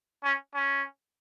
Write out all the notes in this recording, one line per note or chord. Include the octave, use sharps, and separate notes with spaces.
C#4
C#4